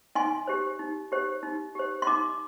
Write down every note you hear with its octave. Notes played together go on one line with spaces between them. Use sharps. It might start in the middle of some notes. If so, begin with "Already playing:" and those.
D#4 G#5 C6
G4 C5
D#4
G4 C5
D#4
G4 C5
C6
D#4 A#5 D6